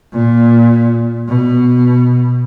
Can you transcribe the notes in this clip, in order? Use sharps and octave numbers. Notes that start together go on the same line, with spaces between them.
A#2
B2